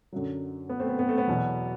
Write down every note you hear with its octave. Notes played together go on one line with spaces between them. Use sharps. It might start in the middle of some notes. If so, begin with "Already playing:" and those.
F#2 D3 F#3
B3
A3 C4
B3
B3
A3
B3
E2 B2 F#3